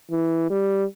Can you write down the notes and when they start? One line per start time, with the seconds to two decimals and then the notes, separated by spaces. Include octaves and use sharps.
0.11 E3
0.50 G3